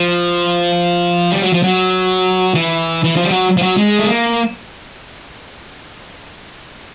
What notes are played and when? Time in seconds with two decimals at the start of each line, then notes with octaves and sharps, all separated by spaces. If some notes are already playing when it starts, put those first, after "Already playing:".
Already playing: F3
1.31 G3
1.42 F#3
1.53 F3
1.63 F#3
2.54 E3
3.04 E3
3.16 F3
3.24 G3
3.31 F#3
3.57 F3
3.62 F#3
3.77 G#3
3.99 A3
4.08 A#3